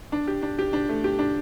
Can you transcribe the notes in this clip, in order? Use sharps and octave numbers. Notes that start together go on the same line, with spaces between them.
D4
G4
D4
G4
D4
A3
G4
D4